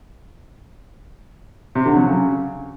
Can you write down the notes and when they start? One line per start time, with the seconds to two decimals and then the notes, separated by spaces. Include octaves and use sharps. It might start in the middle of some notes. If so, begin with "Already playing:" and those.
1.75 C3
1.86 D3
1.96 F#3
2.07 C#3